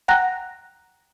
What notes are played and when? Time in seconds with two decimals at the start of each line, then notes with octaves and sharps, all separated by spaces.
0.08 F#5 G5 A#5 F#6 A#6